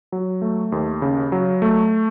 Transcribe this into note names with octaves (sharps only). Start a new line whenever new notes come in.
F#3
A3
D#2
C#3
F#3
A3